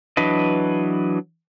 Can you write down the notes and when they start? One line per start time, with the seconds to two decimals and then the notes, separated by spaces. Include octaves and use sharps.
0.17 E3 F#3 D4 B4 D#5